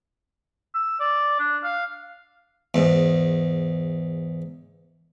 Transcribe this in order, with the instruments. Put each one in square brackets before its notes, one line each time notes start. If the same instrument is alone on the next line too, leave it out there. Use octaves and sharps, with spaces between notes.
[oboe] E6
D5
D4
F5
[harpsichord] E2 G#2